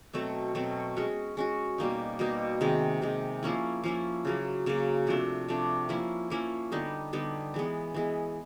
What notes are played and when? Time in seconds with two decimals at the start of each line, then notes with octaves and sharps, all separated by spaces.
0.13 B2 F#3 A3 C4
0.55 B2 F#3 A3 C4
0.97 G#3 C#4 F#4
1.37 G#3 C#4 F#4
1.78 B2 G3 A#3 D#4
2.19 B2 G3 A#3 D#4
2.61 C3 D#3 G#3
3.02 C3 D#3 G#3
3.43 F3 A#3 C#4 E4
3.84 F3 A#3 C#4 E4
4.25 C#3 F#3 A#3
4.66 C#3 F#3 A#3
5.07 C3 F3 A3 D4
5.48 C3 F3 A3 D4
5.89 F3 A#3 C#4 E4
6.30 F3 A#3 C#4 E4
6.72 D3 G3 B3 D#4
7.13 D3 G3 B3 D#4
7.54 E3 G#3 B3
7.94 E3 G#3 B3